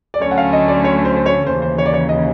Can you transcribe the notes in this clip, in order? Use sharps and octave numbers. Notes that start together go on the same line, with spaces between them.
D5
D2 D3 F#3 A3 C#4 C#5
F#5
F5
D#5
D5
C#5
C5
C5
C#5
D#2 C#3 E3 C5
C5
C#5
D5
C#5
D#5